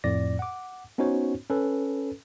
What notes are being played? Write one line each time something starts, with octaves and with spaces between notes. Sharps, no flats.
F2 A2 D5 A#6
F#5 D6
B3 C#4 D#4 F#4 C5 C#5
C#4 A4 B4